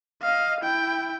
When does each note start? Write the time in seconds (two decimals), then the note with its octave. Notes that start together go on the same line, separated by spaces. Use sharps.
0.22 D#5 F5
0.61 E4 G5